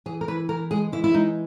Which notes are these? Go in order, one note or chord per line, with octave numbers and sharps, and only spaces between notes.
E3 G#4
A#4
E3 B4
E3 A#4
G#3 G#4
E3 E4
E4
G#3 D#4